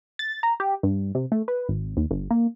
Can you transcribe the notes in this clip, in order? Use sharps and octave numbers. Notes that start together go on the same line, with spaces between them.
A6
A#5
G4
G2
C3
A3
B4
G#1
D#2
G1
A#3